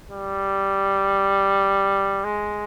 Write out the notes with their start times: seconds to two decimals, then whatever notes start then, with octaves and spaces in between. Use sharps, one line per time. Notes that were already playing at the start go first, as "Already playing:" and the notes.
0.11 G3
2.24 G#3